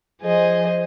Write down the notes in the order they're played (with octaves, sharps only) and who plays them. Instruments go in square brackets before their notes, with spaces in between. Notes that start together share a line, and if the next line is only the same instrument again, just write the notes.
[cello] F3 C5 [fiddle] G#4 D#5